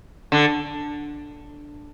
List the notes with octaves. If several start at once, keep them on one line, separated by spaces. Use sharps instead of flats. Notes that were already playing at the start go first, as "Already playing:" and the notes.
D3